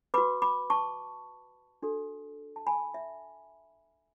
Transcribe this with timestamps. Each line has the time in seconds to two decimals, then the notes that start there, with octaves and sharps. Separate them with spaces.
0.14 F#4 B4 B5 D6
0.42 B5 D6
0.70 A5 C#6
1.82 D4 F#4 A4
2.56 A5
2.67 G#5 B5
2.94 E5